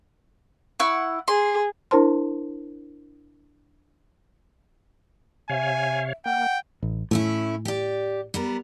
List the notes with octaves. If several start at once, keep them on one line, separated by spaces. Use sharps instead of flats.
E4 F#5 C#6
G#4 C6
D4 E4 A#4 C5 A5 C6
C3 C#5 E5 F5 G#5
A#3 F#5 G5
A1
A2 A3 C#4 E4
G4 D5
G3 B3 A#4